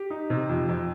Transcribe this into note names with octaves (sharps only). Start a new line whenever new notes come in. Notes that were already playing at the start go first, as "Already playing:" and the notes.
Already playing: G4
D#4
C3
F2
F2